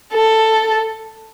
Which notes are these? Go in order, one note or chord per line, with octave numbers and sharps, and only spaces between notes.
A4